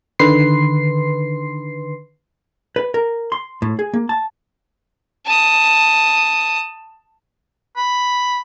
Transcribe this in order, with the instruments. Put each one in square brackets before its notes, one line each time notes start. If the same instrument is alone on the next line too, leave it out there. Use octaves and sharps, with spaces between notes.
[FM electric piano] D3 D#3 B4 C6 C7
[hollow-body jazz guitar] B4
A#4
C6
A2
G#4
A#3
A5
[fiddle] A5 D#6
[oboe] B5